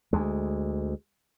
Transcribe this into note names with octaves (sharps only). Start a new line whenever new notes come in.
D2 G#3